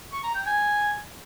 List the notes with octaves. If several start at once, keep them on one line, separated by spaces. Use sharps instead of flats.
C#6
A#5
G5
G#5